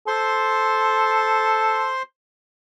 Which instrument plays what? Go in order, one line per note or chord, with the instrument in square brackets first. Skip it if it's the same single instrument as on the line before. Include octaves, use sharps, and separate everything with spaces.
[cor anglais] A4 [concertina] C5 C6